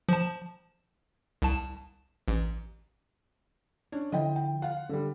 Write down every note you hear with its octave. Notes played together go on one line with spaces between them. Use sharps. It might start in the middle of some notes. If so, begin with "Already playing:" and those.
F3 A5
C2 A5
A1
C#4 D4
D3 F3 E4 D#5 G5
G5
F4 F5 F#5
D3 G3